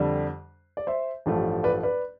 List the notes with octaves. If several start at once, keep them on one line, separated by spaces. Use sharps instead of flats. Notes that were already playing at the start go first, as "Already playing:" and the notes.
Already playing: F2 D3 G3
D5
C5 E5
A1 G2 F3 A3
B4 D5
B4 D5